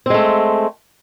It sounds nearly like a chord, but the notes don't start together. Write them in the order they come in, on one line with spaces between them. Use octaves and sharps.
C4 G#3 A3